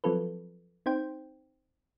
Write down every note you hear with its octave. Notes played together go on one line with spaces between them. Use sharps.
F3 F#3 C4 F4 A4 B4
C4 D#4 C5 G5